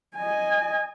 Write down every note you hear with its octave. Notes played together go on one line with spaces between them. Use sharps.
D#5 G#5